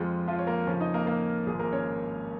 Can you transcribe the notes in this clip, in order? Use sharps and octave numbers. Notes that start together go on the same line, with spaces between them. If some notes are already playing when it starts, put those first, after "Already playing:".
Already playing: F2 F3 G#3 F4
F3 F4
C#5
A#3 A#4
F2 C#3 F3 C#4 C#5
D#4 D#5
A#3 A#4
A#3 A#4
G#1 G#2 F3 G#3 G#4
A#3 A#4
C#4 C#5